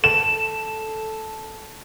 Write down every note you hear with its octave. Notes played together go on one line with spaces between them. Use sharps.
A4 E7